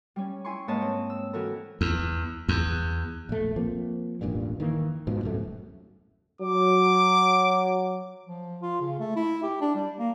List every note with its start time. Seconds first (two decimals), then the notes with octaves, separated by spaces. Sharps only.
0.16 G3 C#4
0.45 E4 G#5 C6 C#6
0.68 G#2 A#3 B4 C#5 D#5 A5
0.81 C4
1.10 E6
1.33 E3 F#4 A4 A#4 A#5
1.81 E2
2.49 E2
3.29 A#1 A3
3.56 F3 A#3 C4
4.21 E1 A1 G2 A#2
4.60 D#3 E3 A#3
5.07 G#2 B2 F3
5.23 D1 C2 F#2 A3
6.41 F#3 D6
8.26 F3
8.62 F4
8.81 C#3
9.00 A3
9.16 E4
9.43 G4
9.61 D4
9.75 G3
9.99 A#3